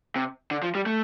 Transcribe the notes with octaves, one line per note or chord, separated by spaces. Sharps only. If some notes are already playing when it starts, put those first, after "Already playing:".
C3
D3
F3
G3
A3